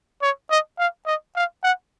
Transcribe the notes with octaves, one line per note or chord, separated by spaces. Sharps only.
C#5
D#5
F5
D#5
F5
F#5